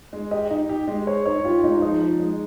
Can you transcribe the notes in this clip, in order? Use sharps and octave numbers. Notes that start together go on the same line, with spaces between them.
G#3
G4 D#5
D#4
G4
G#3
C5 C#5
D#4 C#5
F4 G4
G#3 D#4
F3 D#4
F3
G#3